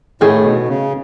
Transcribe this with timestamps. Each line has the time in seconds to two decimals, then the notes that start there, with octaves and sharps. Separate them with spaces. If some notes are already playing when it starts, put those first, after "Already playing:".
0.21 A2 D#3 A3 D#4 G#4
0.44 B2
0.68 C#3